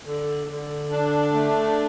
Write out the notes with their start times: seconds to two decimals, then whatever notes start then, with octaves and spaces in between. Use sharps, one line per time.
0.05 D3
0.48 D3
0.91 D4
1.33 A3